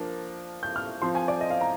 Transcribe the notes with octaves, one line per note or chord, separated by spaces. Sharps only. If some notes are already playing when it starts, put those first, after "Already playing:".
Already playing: F3 A#3 D4
G6
F6
F3 C4 C6
G#5
D5
D#5
F5
A#5